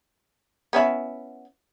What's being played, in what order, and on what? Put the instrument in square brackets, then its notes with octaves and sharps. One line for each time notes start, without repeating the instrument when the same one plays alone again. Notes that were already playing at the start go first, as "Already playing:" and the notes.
[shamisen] B3 C#4 E4